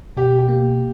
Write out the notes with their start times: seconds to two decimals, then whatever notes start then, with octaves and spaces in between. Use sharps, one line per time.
0.17 B2 G4
0.39 G4
0.49 A#3